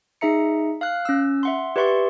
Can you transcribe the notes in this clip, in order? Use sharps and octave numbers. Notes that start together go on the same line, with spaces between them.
D#4 G#4 E5 A#5 C#7
F5 F6 F#6
C#4 E6
E5 F#5 C6
G4 B4 D5 E5 C6 C#6